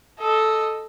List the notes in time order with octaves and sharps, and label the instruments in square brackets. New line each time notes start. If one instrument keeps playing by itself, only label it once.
[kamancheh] A4 D#5